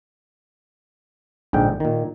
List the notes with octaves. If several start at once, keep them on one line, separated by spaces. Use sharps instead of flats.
A#1 G#2 D3 G5
A#2 D#3